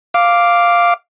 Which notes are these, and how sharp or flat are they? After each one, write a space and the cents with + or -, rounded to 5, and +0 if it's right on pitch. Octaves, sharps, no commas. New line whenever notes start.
F5 +0 D6 +0